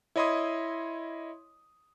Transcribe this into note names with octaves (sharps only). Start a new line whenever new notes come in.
E4 C#5 D#5 B5 C6 D#6